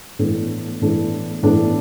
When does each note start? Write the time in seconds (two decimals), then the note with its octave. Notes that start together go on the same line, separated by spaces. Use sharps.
0.19 A2 E3 B3 D4 A4
0.81 A2 E3 B3 D4 A4
1.43 A2 E3 B3 D4 A4